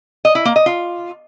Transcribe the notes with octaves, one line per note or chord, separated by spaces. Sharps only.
D#5
E4
A#3
D#5
F4